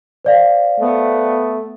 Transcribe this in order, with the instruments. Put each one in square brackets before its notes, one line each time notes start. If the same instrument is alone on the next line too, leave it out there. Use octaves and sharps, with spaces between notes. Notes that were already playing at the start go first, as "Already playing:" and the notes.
[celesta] C5 D5 F5
[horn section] A3 B3